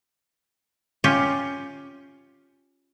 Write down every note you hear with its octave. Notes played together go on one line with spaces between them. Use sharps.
C#4 F4 G4